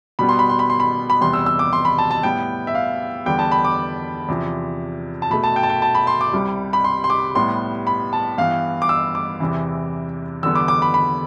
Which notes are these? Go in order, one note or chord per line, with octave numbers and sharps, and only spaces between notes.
B2 G3 B3 B5
C6
B5
C6
B5
C6
B5
B5
E2 C3 G3 B3 C6
E6
E6
D6
C6
B5
A5
A5
A2 G3 B3 G5
E5
F5
E2 D3 G3 B3 G5
A5
B5
D6
E2 C3 F3
A5
B2 A3 B5
A5
G5
A5
G5
A5
B5
C6
D6
C2 C3 G3
B5
C6
C6
D6
A2 G3 B3 C6
B5
A5
G2 E3 B3 F5
D6
E6
D6
E2 C3 E3
E2 D3 G3 B3 E6
D6
D6
B5
B5